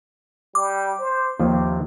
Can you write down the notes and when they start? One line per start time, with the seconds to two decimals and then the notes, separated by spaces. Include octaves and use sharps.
0.55 G3 D6
0.98 C5
1.39 D#2 C3 F3